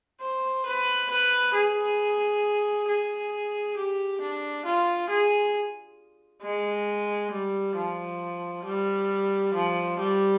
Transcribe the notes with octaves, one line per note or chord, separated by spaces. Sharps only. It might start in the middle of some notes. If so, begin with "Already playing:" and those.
C5
B4
B4
G#4
G#4
G4
D4
F4
G#4
G#3
G3
F3
G3
F3
G3